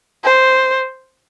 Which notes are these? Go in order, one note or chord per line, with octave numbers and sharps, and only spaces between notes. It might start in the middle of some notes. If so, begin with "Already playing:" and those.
C5